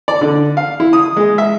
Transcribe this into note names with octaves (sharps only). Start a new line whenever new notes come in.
D5
D3
F5
E4
D#6
G#3
E5